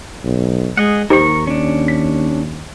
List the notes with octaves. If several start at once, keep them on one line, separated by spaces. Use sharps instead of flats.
B1
G#3 G#4 D#5 F#5
D#2 D#4 G4 A#4 C5 C#6
C#4 D4
B6